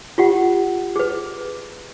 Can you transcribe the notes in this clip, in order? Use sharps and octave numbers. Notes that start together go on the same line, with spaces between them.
F4 G4 F#5
G#4 B4